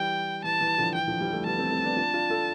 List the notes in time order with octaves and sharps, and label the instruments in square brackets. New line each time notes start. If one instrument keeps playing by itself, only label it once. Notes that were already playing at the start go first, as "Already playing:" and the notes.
Already playing: [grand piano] E3 G3 [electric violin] G5
[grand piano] E3 [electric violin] A5
[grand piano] E3
D3 F3
[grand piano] E3 [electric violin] G5
[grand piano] D3 F3
E3 G3
F3 A3
[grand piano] G3 B3 [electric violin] A5
[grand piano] A3 C4
A3 C4
B3 D4
D4 F4
D4 F4
F4 A4